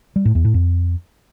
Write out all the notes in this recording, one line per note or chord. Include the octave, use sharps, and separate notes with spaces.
G3
A2
E2
A2
F2